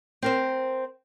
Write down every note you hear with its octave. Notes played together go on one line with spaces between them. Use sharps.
C4 A#4 C5